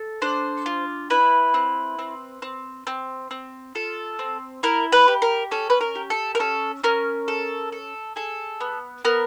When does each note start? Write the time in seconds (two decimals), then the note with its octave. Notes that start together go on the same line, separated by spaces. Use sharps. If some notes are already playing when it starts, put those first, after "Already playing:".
Already playing: A4
0.22 D4 C5
0.66 F4
1.10 E4 B4
1.54 C4
1.99 C4
2.42 C4
2.87 C4
3.31 C4
3.75 F4 A4
4.19 C4
4.63 E4 A#4
4.92 B4
5.08 G4
5.22 A#4
5.51 C#4 A4
5.70 B4
5.81 A#4
5.95 G4
6.10 A4
6.35 A#4
6.39 C#4 A4
6.84 C#4 A#4
7.28 A4
7.72 A4
8.16 G#4 A4
8.60 B3
9.05 B3 A#4